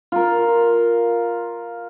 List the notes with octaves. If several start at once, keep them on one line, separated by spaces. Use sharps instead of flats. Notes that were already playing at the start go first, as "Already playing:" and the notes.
F4 A#4